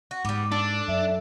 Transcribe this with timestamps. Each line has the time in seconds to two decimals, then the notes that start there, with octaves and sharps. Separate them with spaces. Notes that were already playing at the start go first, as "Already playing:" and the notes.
0.11 F#4
0.25 G#2 G3 B3 D6
0.52 D4 A4
0.88 F#2 E5